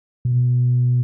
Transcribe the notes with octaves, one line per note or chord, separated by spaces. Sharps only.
B2